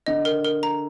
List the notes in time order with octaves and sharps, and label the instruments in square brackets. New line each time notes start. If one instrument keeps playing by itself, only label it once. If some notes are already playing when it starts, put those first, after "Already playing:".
[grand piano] D3 [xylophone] D#5
[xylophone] A#4
A#4
A#5